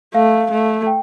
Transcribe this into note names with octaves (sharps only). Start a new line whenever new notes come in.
A3 F5
A3
G5